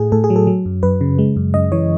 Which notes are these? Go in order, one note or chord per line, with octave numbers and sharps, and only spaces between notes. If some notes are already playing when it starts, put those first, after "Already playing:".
Already playing: A2 A3 G#4
A2 A4
G#4
F#3
A4
F#3
F#2
F#2 B4
C#3
G#3
F#2
F#2 D#5
E3 C#5